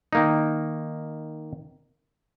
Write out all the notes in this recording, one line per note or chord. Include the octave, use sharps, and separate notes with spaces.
D#3 A#3 D#4